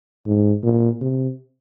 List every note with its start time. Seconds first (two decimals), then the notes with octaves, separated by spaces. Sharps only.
0.26 G#2
0.63 A#2
1.01 C3